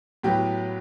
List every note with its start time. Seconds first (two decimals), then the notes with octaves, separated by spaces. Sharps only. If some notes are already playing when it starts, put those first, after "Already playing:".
0.23 A2 F#3 B3 G4